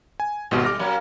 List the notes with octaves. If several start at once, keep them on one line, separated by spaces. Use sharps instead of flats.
G#5
G#1 B2 G3 A3
D6 F6 A#6
F#3 A#3 C#4